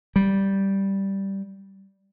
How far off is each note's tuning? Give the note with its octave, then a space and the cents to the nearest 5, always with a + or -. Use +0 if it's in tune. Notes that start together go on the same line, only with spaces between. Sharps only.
G3 -5